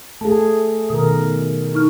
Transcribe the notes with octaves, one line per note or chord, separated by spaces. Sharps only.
A3 G#4 A5
B2 D#3 A#4 D#6
D#4 C#6 F6